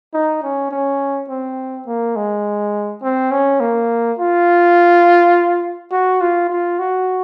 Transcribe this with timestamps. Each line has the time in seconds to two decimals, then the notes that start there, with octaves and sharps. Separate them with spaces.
0.14 D#4
0.43 C#4
0.71 C#4
1.29 C4
1.87 A#3
2.16 G#3
3.03 C4
3.31 C#4
3.60 A#3
4.19 F4
5.92 F#4
6.21 F4
6.50 F4
6.79 F#4